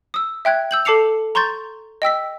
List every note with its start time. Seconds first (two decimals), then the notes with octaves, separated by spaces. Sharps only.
0.14 D#6 E6
0.45 E5 G5 F#6 G#6
0.71 E6 G6 F#7
0.85 A4 A5 D6 C7 C#7 F7
1.35 A#5 C6 C#6 G6 A6
2.02 D#5 G5 E6 B6